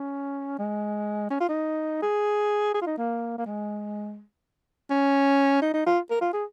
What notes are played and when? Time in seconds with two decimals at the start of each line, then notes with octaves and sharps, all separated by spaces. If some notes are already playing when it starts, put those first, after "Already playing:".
Already playing: C#4
0.59 G#3
1.30 C#4
1.40 F4
1.49 D#4
2.02 G#4
2.74 G#4
2.81 F4
2.87 D#4
2.98 A#3
3.38 A#3
3.46 G#3
4.90 C#4
5.62 D#4
5.74 D#4
5.86 F4
6.10 A#4
6.21 F4
6.33 G#4